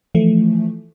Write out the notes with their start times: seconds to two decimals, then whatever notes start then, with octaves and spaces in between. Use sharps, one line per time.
0.15 E3 F3 A3